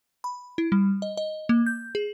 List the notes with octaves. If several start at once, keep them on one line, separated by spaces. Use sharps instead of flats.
B5
E4
G3
D#5
D#5
A#3
G6
G#4